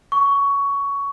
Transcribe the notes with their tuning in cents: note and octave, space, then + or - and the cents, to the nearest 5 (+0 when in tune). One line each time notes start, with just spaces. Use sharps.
C#6 +15